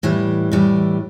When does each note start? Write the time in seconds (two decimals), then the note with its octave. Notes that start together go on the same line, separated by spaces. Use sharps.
0.03 A2 E3 G3
0.52 A2 E3 G3